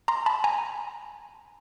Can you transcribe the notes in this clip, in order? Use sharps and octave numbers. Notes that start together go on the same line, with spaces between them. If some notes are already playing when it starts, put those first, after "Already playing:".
A#5 C6
A5 B5
G#5 A#5